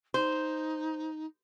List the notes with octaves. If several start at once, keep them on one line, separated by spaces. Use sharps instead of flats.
D#4 C5